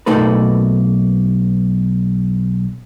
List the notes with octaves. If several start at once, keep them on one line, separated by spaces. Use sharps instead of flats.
B1 A3 A#3 D#4 A4 B4